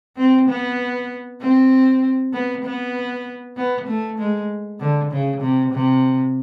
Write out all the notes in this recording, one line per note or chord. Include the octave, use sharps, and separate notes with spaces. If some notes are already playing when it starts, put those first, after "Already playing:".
C4
B3
C4
B3
B3
B3
A3
G#3
D3
C#3
C3
C3